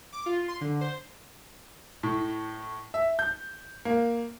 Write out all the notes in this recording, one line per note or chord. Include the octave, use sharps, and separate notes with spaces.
D6
F4
C6
D3
C5
A2
E5
G6
A#3